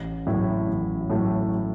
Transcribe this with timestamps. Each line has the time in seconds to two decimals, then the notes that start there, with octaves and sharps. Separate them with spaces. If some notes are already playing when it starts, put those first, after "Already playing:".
Already playing: A1
0.27 A2 F#3 A3 E4
0.68 A1
1.10 A2 F#3 A3 E4